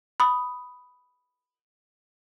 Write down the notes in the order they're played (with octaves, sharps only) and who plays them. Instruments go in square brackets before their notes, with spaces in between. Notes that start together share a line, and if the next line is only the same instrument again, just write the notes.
[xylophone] B5 D#6